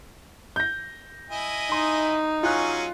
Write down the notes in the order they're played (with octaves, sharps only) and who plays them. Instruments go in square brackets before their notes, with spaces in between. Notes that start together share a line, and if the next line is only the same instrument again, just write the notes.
[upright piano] G6 A#6
[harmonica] E4 D#5 G#5
[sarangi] D#4 [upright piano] C6
[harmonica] F#3 C#4 G#4 [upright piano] F4 F#6